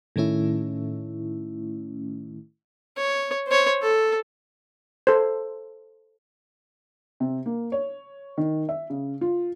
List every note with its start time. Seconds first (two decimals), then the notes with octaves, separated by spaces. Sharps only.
0.16 A2 D#3 A3 C#4 E4
2.97 C#5
3.47 C5 C#5
3.82 A4
5.07 A4 C5
7.20 C3
7.46 A#3
7.72 C#5
8.37 D#3
8.69 E5
8.90 C#3
9.21 F4